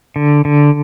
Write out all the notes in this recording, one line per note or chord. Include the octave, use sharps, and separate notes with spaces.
D3
D3